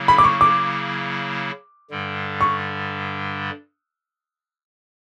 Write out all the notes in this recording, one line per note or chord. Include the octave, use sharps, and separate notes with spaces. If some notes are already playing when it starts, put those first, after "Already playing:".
Already playing: C#3 F#3 A#3 E4
B5
D6
C#6
D6
G2 D3 G3
C#6